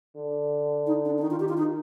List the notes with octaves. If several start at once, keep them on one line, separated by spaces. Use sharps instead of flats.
D3
D#4
D4
D4
D#3 D#4
F4
G4
F4
D#4